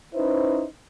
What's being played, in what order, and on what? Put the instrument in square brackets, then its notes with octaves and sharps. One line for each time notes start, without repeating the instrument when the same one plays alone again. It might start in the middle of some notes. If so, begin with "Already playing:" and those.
[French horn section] C#4 D#4 E4 B4 C5